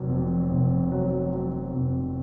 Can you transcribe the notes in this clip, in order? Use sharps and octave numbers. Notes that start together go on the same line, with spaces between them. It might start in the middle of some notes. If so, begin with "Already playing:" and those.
Already playing: F1 F#3
F2
F1
F#3
F#3
F1